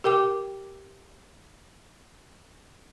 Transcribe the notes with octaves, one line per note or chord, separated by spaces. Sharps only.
G4 A#4 G5 D6